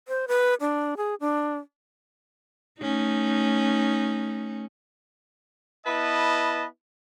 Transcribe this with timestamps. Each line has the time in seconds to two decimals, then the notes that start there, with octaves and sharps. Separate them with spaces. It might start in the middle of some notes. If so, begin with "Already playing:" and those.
0.08 C5
0.28 B4
0.61 D4
0.97 G#4
1.20 D4
2.80 A3 C#4 D#4
5.85 B3 E4 B4 D#5 A5